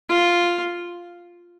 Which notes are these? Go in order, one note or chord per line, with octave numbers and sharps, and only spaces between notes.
F4